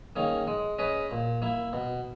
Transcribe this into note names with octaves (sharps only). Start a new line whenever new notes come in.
D#3 A#3 C#4 G#4
G#3
C#4 G#4 B4 D#5
A#2
A#3 E4
B2